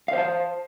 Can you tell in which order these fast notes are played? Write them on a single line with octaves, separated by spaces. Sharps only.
F5 C5 A5